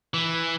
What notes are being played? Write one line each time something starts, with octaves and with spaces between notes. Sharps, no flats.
E3